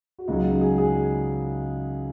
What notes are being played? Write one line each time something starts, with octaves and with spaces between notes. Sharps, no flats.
F#4
C#2 C#3 F#3 D#4
G#4
G#4